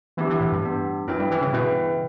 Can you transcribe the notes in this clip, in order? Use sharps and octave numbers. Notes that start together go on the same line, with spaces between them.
E3 B3 D4 G4
E3
A2
G2
B3 D4 G4
F#2 E4 B4 E5 G5
G2
E3
C#3
B2 E4 B4 E5 G5